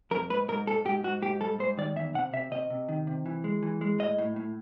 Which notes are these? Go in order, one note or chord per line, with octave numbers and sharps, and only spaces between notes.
F2 A#4
G#2 B4
G#2 A#4
G#2 A4
G#2 G4
G#2 F#4
G#2 G4
G3 A4
G#2 C5
D#3 D5
E2 E5
C3 F#5
C3 E5
C3 D#5
C3
D#3
C3
E3
G#3
E3
G#3
A2 D#5
A2
A2